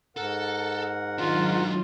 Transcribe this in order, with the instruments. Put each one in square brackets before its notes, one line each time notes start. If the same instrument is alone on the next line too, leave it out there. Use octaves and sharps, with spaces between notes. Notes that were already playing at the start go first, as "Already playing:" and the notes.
[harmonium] G#2 A#4 F#5 [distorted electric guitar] A4
[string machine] D#3 F#3 [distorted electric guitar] G#3 D4 [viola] F4